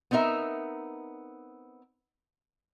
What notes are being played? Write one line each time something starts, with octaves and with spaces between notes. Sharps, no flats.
B3 C4 D#4 A#4 E5